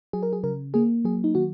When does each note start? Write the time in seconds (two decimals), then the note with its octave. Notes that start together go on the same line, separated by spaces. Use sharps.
0.13 F#3 G#4
0.23 A#4
0.33 G#4
0.44 C#3 A#4
0.74 A#3 G#4
1.05 F#3 G#4
1.24 D#4
1.35 D#3 F#4